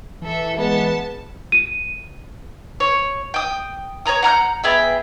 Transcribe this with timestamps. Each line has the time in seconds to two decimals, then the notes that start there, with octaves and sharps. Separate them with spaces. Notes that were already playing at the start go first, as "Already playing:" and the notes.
0.22 E3 A4 E5
0.57 G#3 B3 A5
1.52 D#7
2.80 C#5
3.34 G5 D#6
4.06 C#5 D5 A#5 D#6
4.23 F#5 A#5 F6 G6
4.64 B3 G#4 E5 G5